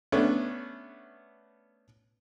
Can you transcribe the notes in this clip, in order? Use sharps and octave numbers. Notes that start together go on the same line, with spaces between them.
A3 B3 C#4 D4